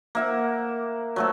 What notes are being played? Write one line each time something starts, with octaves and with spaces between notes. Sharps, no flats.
A#3 E5 F#5
F#3 A3 A4